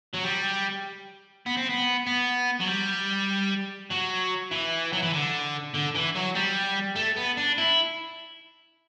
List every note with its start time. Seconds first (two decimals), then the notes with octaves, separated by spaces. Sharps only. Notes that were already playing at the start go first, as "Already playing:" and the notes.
0.14 F#3
0.24 G3
1.46 B3
1.57 C4
1.70 B3
2.06 B3
2.60 F#3
2.68 G3
3.90 F#3
4.51 E3
4.93 F#3
5.02 E3
5.13 D3
5.74 D3
5.95 E3
6.15 F#3
6.35 G3
6.96 A3
7.16 B3
7.37 D4
7.58 E4